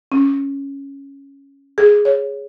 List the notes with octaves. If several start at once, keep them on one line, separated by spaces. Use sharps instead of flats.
C#4
G#4
C#5